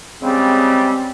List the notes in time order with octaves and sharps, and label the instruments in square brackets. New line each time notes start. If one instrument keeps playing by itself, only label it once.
[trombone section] C#3 G3 G#3 [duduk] C4